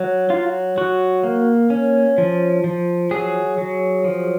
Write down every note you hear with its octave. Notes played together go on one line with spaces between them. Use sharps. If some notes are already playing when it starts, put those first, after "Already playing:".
Already playing: F#3
F#3 F4
F#3 F#4
A#3
C#4
F3
F3
F#3 G#4
F#3
F3